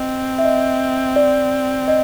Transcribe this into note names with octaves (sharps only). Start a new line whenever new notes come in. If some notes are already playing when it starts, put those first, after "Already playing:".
Already playing: C4 D#5
E5
D#5
D5
D#5